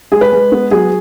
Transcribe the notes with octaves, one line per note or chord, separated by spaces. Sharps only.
G#3 G#4
B4
G#3
B3
F#3 G#4